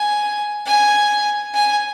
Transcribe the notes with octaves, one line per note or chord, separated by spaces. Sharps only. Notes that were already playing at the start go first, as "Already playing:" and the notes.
Already playing: G#5
G#5
G#5